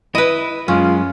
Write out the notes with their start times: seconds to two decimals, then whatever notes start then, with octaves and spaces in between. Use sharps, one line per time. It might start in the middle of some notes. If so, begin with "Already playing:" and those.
0.15 E4 B4 D#5
0.68 F#2 G#3 C#4 F4